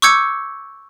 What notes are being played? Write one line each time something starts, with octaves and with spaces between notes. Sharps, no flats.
C#6 D6 E6 G6 G#6 C#7